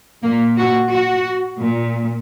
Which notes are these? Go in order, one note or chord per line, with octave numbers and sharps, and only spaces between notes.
A#2 A#3
F#4
F#4
A#2